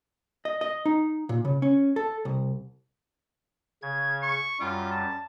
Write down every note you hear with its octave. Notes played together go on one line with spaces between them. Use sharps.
D#5
D#5
D#4
A#2
C#3
C#4
A4
C2
C#3 G#6
C#6
F#2 G3 F4
A5